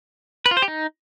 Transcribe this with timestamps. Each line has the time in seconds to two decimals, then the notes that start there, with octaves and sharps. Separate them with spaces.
0.46 B4
0.51 F4
0.57 C5
0.62 G4
0.68 D#4